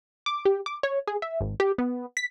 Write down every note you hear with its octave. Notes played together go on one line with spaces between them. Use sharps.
D6
G4
D6
C#5
G#4
E5
G#1
G4
B3
B6